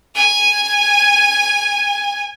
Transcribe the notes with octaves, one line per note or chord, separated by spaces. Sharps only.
G#5 D#7